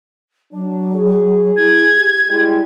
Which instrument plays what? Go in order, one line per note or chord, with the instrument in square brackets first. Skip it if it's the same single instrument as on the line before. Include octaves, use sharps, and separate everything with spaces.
[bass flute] F#3 [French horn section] D4
[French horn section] G#4
[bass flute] E4 [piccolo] G#6
[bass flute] G4
[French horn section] G3 G#3 [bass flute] E4